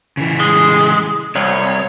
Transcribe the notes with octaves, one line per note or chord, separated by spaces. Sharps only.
C#3 E3
G#3
C2 C#5